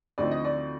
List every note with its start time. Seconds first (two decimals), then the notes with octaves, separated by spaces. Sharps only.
0.18 D2 D3 F3 C4 D#4 D5
0.31 D#5
0.45 D5